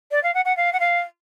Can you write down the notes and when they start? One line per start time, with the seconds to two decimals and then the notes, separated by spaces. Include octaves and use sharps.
0.11 D5
0.23 F5
0.34 F#5
0.45 F#5
0.57 F5
0.73 F#5
0.80 F5